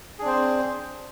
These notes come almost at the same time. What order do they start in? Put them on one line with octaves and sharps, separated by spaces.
G#4 D4 C4 C5